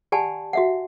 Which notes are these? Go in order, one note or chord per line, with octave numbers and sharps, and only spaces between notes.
G4 D5 F#5 G#5 A5 B5
F#4 E5 F#5